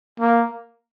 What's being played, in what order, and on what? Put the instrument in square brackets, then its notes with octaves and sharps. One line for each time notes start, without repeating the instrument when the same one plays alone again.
[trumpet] A#3